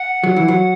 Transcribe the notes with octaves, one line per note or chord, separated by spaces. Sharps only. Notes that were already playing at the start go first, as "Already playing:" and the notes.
Already playing: F#5
F#3
E3
F#3